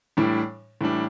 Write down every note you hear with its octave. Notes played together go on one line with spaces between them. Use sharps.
A2 E3 G3 D4
A2 E3 G3 D4